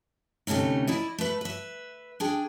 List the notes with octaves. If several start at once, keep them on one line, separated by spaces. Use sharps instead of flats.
D2 C3 A3 C#4 D#4
E4 D5 D#5
A3 B4
B4 E5
D4 G#4 G5